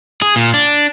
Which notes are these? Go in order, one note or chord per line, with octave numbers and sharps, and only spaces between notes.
G#4
A#2
D4